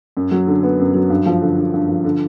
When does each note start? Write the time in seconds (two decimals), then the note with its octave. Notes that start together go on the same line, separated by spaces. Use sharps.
0.17 F#2
0.31 F#3
0.47 D3
0.63 B3
0.79 F#2
0.94 F#3
1.10 G2
1.26 F3
1.42 D3
1.58 G2
1.74 G2
1.89 F3
2.04 D3